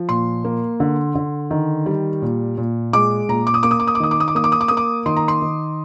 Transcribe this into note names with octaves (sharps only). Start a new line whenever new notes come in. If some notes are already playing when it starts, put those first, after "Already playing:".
Already playing: F3
A#2 C6
A#3
D3
D3
D#3
G3
A#2
A#2
G#3 D6
A#2 A#5
D6
D#6
A#3 D6
D#6
D6
D#6
D6
D#3 D#6
D6
D#6
D6
A#3 D#6
D6
D#6
D6
A#3 D#6
D6
D#3 C6
A#5
C6
D#3